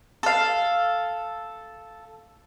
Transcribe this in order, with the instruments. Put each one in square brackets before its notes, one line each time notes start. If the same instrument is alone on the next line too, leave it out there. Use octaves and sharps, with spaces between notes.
[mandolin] A4 F5